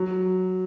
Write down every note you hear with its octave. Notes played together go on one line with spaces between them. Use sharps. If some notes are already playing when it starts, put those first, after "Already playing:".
Already playing: F#3